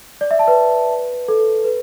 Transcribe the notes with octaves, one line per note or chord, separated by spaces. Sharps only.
D5
E5
A5
B4
A4
B4